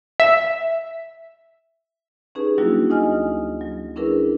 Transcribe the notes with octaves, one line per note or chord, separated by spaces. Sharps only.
E5
C#4 D#4 G4 G#4 B4
F#3 G3 A#3 D4 E4 F#4
D2 F#3 D#4 D#5 G#5 F6
F#3
C#4 D4 E4 G#4 A#4 B4